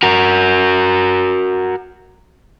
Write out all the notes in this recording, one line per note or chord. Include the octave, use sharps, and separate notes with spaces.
F#4 A#4